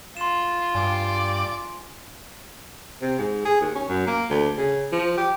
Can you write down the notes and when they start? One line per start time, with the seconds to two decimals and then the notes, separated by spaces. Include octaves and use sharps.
0.17 F4 C6 E7
0.75 G2 D5 G#5
3.02 C3
3.19 G#2
3.45 G#4
3.61 D#2
3.75 C#4
3.88 F#2
4.07 A#3
4.30 D2
4.57 C#3
4.92 F3
5.17 G4